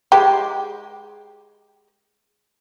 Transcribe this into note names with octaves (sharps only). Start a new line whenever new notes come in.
G#3 G4